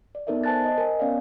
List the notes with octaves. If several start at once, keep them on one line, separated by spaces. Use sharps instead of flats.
D5
B3 D#4 A4 A#4 D5 E5
C5 G#5 A5 F#6 A6
D#5
A#4 G#5
B3 C#4 C#5 D5 F5